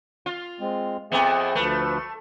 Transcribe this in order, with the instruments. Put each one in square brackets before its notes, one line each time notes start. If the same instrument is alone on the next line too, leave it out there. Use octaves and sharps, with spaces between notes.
[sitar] F4
[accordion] G#3 C4
[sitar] F2 B3 [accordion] G#4 E5 G5
[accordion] D2 F3 B4 [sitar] A3